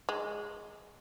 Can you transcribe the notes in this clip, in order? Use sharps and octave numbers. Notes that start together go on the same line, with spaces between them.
G#3